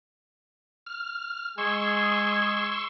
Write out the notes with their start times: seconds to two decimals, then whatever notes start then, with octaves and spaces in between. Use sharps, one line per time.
0.86 F6
1.58 G#3 G#4 C6 C#6 E6